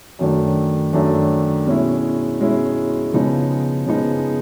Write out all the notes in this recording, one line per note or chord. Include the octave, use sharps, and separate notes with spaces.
F#2 D#3 F#3 A3 D4
F#2 D#3 F#3 A3 D4
B2 G#3 C#4 E4
B2 G#3 C#4 E4
C#3 F3 G#3 B3 D#4
C#3 F3 G#3 B3 D#4